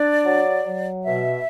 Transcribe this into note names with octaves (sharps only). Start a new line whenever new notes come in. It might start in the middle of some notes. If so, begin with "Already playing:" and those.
Already playing: D4 D5
F#3
F#3
B2 E5